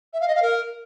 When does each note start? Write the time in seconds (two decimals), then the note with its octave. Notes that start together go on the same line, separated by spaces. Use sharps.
0.13 E5
0.21 F5
0.28 D#5
0.35 F5
0.42 A#4